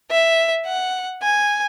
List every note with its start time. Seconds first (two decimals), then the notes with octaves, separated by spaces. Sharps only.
0.11 E5
0.66 F#5
1.23 G#5